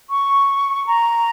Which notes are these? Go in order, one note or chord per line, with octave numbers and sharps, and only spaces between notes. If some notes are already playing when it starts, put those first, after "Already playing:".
C#6
A#5